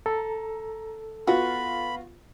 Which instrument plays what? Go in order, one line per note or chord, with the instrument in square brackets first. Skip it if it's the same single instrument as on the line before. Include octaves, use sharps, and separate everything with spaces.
[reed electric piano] A4 [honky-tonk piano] A#5
[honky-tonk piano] B3 F4 [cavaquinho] F#4 [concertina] B5